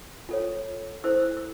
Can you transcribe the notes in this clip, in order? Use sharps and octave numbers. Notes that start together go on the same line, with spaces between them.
F4 A4 C#5
E4 A4 C5 E6
E6
E6